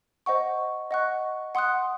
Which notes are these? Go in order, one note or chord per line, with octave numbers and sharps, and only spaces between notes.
C5 D#5 F#5 C#6
D#5 F#5 C#6 F#6
F#5 C6 D#6 F#6